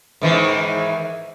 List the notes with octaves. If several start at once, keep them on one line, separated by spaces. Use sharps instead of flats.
G#2 D#3 E3